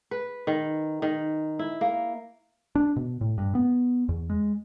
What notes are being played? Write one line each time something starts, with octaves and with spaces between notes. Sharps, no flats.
B4
D#3
D#3
E4
A#3
D4
B2
A2
G2
B3
E2
G#3